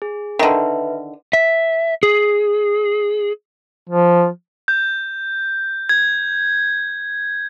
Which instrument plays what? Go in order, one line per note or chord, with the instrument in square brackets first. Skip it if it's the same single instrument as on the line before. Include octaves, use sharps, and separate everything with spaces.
[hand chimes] G#4
[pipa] D3 D#3 [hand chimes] B4 E5
[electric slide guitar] E5
G#4
[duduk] F3
[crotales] G6
G#6